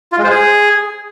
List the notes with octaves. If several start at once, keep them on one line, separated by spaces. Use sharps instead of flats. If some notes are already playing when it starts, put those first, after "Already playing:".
F4
G#3
C5
G#4